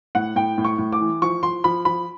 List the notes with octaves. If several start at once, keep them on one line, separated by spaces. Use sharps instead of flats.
A2 F#5
A2 G5
A2
C#6
A2
D6
E3
F3 C#6
F3 C6
F3 B5
F3 B5